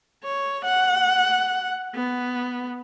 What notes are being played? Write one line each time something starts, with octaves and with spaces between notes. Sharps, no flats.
C#5
F#5
B3